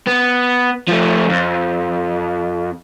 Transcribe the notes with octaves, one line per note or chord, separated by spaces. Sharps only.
B3
F3 A3
F2